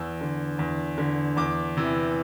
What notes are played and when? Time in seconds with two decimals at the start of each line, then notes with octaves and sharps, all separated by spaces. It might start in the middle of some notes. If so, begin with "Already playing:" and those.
Already playing: E2 E6
0.21 D3
0.59 E2
0.98 D3
1.37 E2 D6
1.77 C3 E3